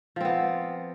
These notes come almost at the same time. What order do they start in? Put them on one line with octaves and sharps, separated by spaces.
F3 C4 B3